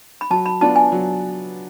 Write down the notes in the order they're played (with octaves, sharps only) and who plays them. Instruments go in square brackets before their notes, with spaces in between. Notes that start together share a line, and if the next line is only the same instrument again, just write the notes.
[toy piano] B5
[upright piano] F#3 [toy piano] A5
[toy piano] B5
[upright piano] B3 D4 F4 [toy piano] A5
[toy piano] G#5
[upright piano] F#3